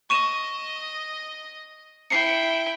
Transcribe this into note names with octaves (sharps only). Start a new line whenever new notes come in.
D#5 C#6 D#7 E7
E4 G5 C7 C#7